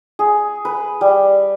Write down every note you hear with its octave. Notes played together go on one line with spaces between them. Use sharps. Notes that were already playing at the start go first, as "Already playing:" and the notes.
G#4
B4
G3